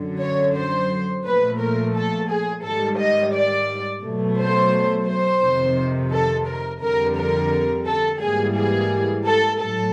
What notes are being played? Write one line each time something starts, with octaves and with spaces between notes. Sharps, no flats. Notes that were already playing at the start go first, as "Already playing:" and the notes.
Already playing: F#2 D3 F#3
C#5
C5
A#2 F3 A3 B4
A#4
A4
G#4
G#2 D#3 G3 A4
D#5
D5
B2 F#3 A3
C5
C5
F2 C3 D#3
A4
A#4
F2 D3 G3 A#4
A#4
A4
G#2 E3 G3 A#3 G#4
G#4
A4
A2 F#3 A4